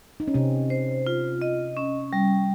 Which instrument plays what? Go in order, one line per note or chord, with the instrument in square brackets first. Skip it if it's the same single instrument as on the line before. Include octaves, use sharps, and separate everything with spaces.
[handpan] D#4
C#4
[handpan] C3 C4 [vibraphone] D#5
[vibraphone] C5
F4
D#5
C#4
G3